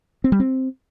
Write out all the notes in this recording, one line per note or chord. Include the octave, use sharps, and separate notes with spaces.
C4
G3
C4